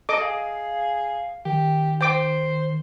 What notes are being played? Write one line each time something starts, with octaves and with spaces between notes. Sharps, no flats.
A4 D#5 D6
G#4 F5
D#3 G4
C5 G5 D6